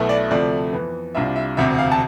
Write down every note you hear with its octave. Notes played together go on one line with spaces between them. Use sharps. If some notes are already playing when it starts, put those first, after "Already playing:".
Already playing: B1 B2 A3 E4
D5
D2 C3 F3 A3 D5
F2 E3 B3
C2 C3 G3 D4 F4 E5
E5
E1 D2 C3 E5
F5
A5